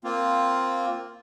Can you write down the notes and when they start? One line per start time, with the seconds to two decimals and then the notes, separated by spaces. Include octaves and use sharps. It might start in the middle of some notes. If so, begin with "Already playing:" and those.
0.04 A#3 C4 F4